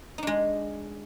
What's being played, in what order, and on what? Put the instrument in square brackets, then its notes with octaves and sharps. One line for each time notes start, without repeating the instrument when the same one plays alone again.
[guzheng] D#4
D4
G#3